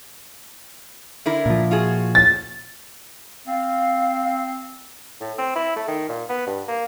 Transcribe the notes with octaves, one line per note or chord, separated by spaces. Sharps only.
D3 E4 A#4
A#2 F3
F4 F#4 G#4
A6
C4 F5
A2
C4
E4
A3
D#3
A#2
B3
G2
A#3